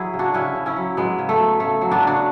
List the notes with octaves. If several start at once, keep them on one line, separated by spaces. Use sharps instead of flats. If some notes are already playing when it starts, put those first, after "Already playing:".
Already playing: F#3 E4 G#4
C#3
D4 F#4
C#3 C#4 E4
C#3
C#4 E4
F#3
F#3 G#3 B3
C#3
A3
F#3
C#3 A3
F#3
B3 D4
C#3
D4 F#4